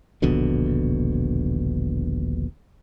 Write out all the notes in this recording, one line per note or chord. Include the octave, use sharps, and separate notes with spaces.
D#1 A#1 B2 D3